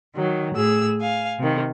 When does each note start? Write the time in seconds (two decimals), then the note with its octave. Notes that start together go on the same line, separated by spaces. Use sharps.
0.14 D#3 F#3
0.53 A2 G#4 E6
0.99 F5 G#5
1.38 C3 D#3